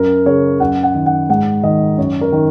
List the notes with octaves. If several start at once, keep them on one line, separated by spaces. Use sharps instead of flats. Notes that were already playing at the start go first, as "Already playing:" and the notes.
Already playing: F#2 A#4
C#3 C#5
F#2 F#5
F#5
D#3
F#5
G#2 F#5
D#3 D#5
F#2 C#5
A#4
D#3